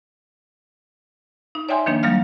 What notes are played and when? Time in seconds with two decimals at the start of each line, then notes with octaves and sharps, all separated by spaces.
1.55 D#4
1.69 C#5 D5 E5 G5 G#5 C6
1.86 D#3 F3 A#3 D4
2.03 F#3 G3 A#3 F5 F6